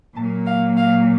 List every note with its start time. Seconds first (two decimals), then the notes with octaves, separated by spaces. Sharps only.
0.16 A#2 F#3 A#3 A5
0.46 F5
0.76 F5